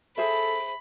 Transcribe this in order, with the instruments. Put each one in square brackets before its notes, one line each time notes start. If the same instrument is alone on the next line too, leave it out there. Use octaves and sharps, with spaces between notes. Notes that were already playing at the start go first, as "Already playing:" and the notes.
[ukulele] G#4 C5 E5 [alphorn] A4 [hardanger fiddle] B5